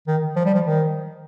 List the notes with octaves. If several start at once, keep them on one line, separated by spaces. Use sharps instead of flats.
D#3
F3
G3
F3
D#3